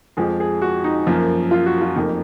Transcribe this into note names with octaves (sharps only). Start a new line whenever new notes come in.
F2 F3 G#3 G#4
G#4
F#4
D#4
F#2 F3 A#3
F4
F#4
F4
F1 F2 F3 A#3 D#4